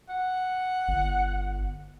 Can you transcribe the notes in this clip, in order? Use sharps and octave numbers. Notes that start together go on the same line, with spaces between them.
F#5
G1